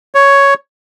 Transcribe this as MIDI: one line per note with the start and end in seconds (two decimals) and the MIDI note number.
0.15 0.54 73